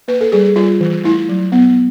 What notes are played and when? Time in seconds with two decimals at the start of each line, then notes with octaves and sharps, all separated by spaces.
0.08 A#3 B4
0.21 A4
0.32 G3 G#4
0.44 G#4
0.56 G3 F4
0.80 E3
1.04 A3 E4
1.29 F#3
1.52 B3